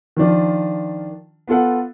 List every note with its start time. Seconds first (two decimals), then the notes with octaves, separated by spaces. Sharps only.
0.16 D#3 F3 D4 F4
1.48 B3 F4 A4 F#5